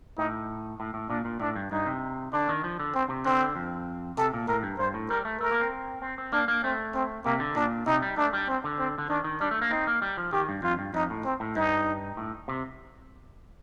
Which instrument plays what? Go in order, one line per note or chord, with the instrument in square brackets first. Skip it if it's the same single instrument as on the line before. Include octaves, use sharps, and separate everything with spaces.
[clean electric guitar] A2 [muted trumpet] D#4
[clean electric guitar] A2
A2
[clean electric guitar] A#2 [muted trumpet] D4
[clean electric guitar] A#2
[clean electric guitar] A2 [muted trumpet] D4
[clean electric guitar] G2
[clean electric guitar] G2 [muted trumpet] D#4
[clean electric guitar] C3
[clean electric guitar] D3 [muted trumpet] D4
[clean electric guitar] D#3
F3
D3
[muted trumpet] C4
[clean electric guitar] C3
[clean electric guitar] D3 [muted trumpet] C4
[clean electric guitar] F2
[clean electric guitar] C3 [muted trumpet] A4
[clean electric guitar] A#2
[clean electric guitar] A2 [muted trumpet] A#4
[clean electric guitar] G2
[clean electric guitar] G2 [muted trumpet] C5
[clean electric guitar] A2
[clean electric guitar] G3 [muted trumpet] A#4
[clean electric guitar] A3
[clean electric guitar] A3 [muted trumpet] A#4
[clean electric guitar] A#3
C4
C4
C4
[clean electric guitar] A#3 [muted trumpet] D4
[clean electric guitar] A#3
[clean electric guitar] A3 [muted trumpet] C4
[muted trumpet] C4
[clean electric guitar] C3 [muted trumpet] A#3
[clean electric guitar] D3
[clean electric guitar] A#2 [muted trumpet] D4
[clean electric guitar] C3 [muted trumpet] D#4
[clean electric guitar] G3
[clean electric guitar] A3 [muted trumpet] D4
[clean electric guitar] G3
[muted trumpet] C4
[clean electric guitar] D3
[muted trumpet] C4
[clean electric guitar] D3
[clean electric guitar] D#3 [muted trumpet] D4
[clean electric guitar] D#3
[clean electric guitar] G3 [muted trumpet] D4
[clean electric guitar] A3
A#3
[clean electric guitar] C4 [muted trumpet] D#4
[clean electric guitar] A#3
G3
F3
[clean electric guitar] D#3 [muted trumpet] G4
[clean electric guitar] G2
[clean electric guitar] F2 [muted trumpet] F4
[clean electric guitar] G2
[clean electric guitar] F2 [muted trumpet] D#4
[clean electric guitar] A2
[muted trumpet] C4
[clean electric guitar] A2
[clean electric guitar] G2 [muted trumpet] D#4
[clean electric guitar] A2
C3